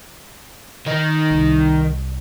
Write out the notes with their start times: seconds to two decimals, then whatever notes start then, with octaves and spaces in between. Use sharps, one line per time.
0.87 D#3 D#4
1.30 C2